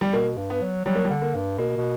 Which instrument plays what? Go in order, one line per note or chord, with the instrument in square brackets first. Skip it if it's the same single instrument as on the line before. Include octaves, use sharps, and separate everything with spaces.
[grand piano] G3
[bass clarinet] B2 [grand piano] A#3
[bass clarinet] G2
[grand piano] B3
[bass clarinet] F#3
[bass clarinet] F#3 [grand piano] G3
[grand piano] A#3
G3
[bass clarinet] D3
[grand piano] A#3
[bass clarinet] G2
[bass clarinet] B2 [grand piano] A#3
[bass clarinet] B2